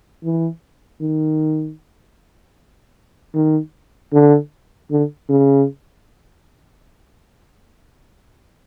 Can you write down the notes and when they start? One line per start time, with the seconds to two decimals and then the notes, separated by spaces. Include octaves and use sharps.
0.24 E3
1.01 D#3
3.35 D#3
4.13 D3
4.91 D3
5.29 C#3